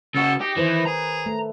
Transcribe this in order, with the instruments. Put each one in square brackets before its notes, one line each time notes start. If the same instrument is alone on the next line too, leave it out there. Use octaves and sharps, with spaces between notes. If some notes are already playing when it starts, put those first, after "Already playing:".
[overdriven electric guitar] C#3 F#4 [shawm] A4
[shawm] D#4 [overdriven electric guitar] G4
[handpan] D#3 B4 C5 [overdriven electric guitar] E3
[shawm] G#4 [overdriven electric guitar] A#5
[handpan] A3